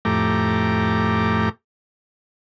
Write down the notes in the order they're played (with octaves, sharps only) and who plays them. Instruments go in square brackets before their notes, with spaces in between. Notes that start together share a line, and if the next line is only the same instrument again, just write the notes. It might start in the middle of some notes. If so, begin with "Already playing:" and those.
[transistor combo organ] F2 A2 A3 G4 A#5 D6